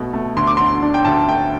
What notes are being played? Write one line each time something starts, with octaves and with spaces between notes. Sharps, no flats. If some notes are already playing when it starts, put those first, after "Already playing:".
Already playing: B2 A3
A3
D2 C6
D6
D3 C6
D4
G5
D2 A5
A3 G5